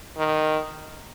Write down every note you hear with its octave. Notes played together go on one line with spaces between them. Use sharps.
D#3